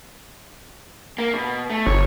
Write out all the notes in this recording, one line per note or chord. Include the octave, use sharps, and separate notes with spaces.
A#3
B2
A3
G1 C#5